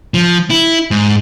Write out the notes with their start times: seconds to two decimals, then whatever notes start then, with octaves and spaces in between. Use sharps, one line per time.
0.14 F3
0.50 E4
0.91 G#2